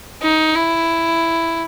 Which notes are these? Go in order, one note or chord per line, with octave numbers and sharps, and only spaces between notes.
D#4
E4